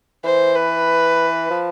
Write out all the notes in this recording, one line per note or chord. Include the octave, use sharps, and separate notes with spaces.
E3 C5
B4
F3